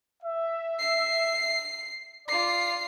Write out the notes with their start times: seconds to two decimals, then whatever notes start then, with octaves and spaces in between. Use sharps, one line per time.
0.23 E5
0.79 C7
2.28 F4 D5 C7